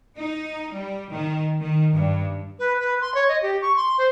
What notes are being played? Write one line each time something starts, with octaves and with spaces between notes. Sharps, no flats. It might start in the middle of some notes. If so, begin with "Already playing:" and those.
D#4
G3
D#3
D#3
G2
B4
B4
C6
C#5
D#5
G4
C#6
C6
C5